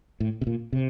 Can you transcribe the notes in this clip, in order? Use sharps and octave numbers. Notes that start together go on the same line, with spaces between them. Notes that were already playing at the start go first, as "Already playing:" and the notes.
A2
C3
A#2
C3